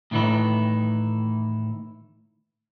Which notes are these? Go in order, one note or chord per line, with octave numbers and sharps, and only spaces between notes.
A2 D#3 E3 D#4 E4